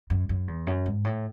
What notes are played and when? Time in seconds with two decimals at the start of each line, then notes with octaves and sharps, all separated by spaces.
0.10 F#2
0.29 F#2
0.47 E2
0.67 F#2
0.86 G#2
1.05 A2